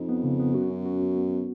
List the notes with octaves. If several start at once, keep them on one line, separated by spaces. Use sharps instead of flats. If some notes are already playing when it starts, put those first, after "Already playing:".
Already playing: F2 D#4
B3
C#3
B3
F#2 F#4
C#4
F#4
B3
B3
B3